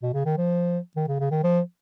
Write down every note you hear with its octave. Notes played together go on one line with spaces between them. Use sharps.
B2
C#3
D#3
F3
D#3
C#3
C#3
D#3
F3